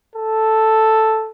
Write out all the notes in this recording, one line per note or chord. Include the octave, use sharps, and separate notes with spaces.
A4